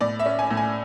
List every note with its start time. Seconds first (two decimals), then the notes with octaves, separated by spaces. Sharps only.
0.01 A2 D5
0.19 E5
0.26 C#4
0.39 G#5
0.51 A2
0.57 G#5